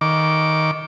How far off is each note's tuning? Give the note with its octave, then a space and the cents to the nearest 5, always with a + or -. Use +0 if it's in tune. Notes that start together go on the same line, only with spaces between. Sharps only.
D#3 +10 D6 -10